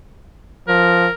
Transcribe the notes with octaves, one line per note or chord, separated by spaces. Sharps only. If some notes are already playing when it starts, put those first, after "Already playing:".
F3 A#4